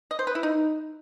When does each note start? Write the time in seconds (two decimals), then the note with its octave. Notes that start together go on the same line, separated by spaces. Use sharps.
0.11 D#5
0.19 C5
0.27 B4
0.35 E4
0.43 D#4